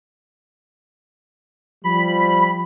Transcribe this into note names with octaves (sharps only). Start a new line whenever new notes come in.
F3 G3 B5